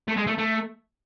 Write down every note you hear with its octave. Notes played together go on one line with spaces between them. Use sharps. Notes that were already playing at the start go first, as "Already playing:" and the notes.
A3
G#3
A3
A3